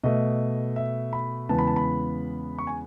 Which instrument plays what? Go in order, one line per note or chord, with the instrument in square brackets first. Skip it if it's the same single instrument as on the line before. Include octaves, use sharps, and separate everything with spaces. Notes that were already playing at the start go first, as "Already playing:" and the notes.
[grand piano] B2 A3 D#5
E5
B5
E2 C#3 G#3 B3 A5
B5
A5
B5
C#6
G#5